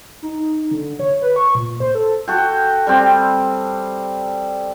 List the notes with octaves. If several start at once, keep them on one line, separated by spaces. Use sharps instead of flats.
D#4
D3
C#5
B4
C#6
A#2
C5
A4
F#4 A4 G5
G3 C4